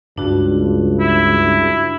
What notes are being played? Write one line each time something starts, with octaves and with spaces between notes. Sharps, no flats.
C#2 G2 D4 F#4
E4